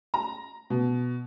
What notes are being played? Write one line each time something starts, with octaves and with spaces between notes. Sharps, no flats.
A#5
B2